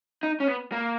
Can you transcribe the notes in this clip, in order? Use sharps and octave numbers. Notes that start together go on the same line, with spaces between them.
D#4
C#4
B3
A#3